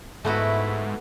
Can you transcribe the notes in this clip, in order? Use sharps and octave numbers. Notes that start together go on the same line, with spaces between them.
G#2 A3 B3 E4 F#4